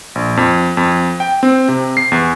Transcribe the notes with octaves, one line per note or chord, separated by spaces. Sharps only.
A#1
F2
F2
G5
C4
C3
C7
E2